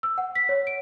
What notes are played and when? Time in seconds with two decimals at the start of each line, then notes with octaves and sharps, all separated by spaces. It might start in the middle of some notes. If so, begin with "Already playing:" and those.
0.03 E6
0.18 F#5
0.35 B6
0.49 C#5
0.67 D7